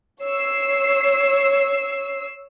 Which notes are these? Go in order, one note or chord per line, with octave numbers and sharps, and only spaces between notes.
C#5 E6 C7